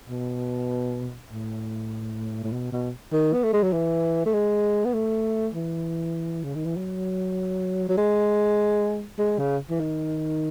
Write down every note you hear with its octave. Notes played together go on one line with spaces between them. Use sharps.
B2
A2
A2
B2
B2
D#3
B3
A3
G#3
F#3
E3
A3
G#3
B3
A3
E3
C#3
D#3
E3
F#3
F#3
G#3
G#3
C#3
E3
D#3